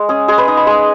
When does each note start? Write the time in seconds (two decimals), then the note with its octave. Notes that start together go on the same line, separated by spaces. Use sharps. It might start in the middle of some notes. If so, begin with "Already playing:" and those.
Already playing: G#3
0.09 C#4 G#4
0.28 G#3 G#4
0.38 B4
0.48 D#4 D#5
0.57 B5
0.67 G#3 G#5